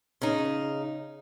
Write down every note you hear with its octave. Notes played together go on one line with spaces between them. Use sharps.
C#3 D#4